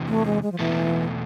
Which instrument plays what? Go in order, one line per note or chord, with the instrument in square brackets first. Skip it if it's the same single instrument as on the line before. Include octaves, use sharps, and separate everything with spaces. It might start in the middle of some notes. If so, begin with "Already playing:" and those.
Already playing: [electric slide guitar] E2 C3 E3
[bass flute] A3
G#3
G#3
F3
[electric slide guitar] E2 B2 A3 [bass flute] E3